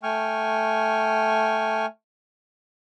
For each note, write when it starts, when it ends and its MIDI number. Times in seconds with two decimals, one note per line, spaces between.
0.03 1.86 57
0.03 1.86 79
0.03 1.86 80
0.03 1.86 85
0.03 1.86 89